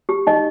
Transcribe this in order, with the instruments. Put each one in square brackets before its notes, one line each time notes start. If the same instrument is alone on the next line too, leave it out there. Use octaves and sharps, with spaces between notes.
[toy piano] G4
D#4 D#5